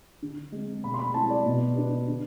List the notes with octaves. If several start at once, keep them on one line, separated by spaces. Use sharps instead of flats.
D3
G#3 C4
B2 B5
C6
B5
G#3 C4 E4 A5
D5
B2
B3 D4
D3